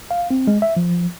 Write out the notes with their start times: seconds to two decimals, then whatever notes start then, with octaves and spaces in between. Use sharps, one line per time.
0.11 F5
0.31 C4
0.47 G#3
0.62 E5
0.77 F3